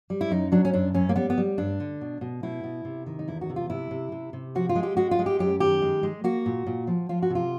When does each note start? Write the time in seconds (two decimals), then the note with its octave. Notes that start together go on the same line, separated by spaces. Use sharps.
0.10 G3
0.21 E4
0.31 F#2 D#4
0.52 F#3 D4
0.65 C#4
0.73 F#2 D4
0.94 F#2 C#4
1.09 A#3
1.16 G3 B3
1.30 B3
1.38 G3
1.58 G2 D4
1.80 D3
2.01 B2
2.21 B2
2.43 B2 E4
2.64 B2
2.85 C3
3.06 D#3
3.19 D#4
3.28 E2 E4
3.41 F#4
3.50 C3
3.56 F4
3.70 C3 E4
3.91 C3
4.12 C3
4.33 C3
4.55 F3 F#4
4.69 F4
4.75 G#3
4.83 G4
4.97 G#3 F#4
5.11 F4
5.19 G#3
5.26 G4
5.39 F#2 G4
5.60 D#3 G4
5.82 G#3
6.03 G#3
6.24 A#3 F#4
6.46 A#2
6.67 A#2
6.87 F3
7.09 F3 F4
7.22 F#4
7.30 C3
7.35 F4